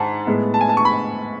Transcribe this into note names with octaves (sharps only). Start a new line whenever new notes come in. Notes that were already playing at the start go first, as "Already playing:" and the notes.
Already playing: G#2 F#5 G#5 A5
A2 G#3 B3
A5
G#5
A5
C#6
B5